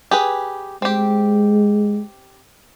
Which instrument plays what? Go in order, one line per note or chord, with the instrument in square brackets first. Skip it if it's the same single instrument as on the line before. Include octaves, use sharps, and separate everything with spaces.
[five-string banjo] G4 G#4 B4
[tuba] G#3 [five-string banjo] C4 G4